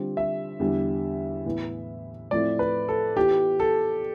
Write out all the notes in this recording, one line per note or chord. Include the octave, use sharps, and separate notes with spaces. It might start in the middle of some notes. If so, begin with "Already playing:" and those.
Already playing: D3 G3 C4 F4
E5
E2 D3 G3
A2 E3 B3
A2 F3 A3 C4 E4 D5
B4
A4
E3 B3 F4 G4
A4